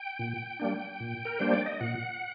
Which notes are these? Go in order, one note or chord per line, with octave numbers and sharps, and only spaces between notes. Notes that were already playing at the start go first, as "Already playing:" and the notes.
Already playing: G5
A#2
G3 A#3 D4
A#2
A#4
G3 A#3 D4 C5
D5
D#5
A#2 F#5